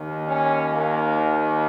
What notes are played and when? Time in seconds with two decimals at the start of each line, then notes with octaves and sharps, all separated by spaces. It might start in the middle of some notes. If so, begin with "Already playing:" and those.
Already playing: D#2 D#3
0.26 C#4
0.71 A#3